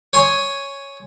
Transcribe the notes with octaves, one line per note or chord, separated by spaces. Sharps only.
C#5 G#5 C6 D#6